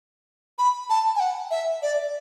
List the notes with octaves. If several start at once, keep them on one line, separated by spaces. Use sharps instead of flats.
B5
A5
G#5
F#5
E5
D5